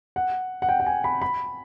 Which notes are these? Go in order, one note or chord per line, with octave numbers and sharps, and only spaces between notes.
F#5
F#5
G5
G5
G#5
B5
B5